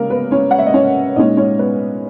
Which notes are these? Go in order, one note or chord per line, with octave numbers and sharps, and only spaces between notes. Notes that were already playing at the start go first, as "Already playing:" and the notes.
Already playing: C#3 G#3 A#3 A#4
B3 B4
C#4 C#5
F#5
E5
D#5
C#4 C#5
A#2 G#3 C#4 D#4 D#5
C#4 C#5
B3 B4